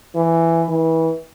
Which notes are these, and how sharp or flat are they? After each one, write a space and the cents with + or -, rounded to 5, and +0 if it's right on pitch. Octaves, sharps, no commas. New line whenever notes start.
E3 +10
E3 -25